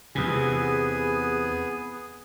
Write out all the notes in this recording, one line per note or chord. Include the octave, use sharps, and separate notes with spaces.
E2 C3 B3 G#4 G#5